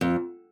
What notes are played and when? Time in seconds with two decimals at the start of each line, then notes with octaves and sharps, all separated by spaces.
0.01 F2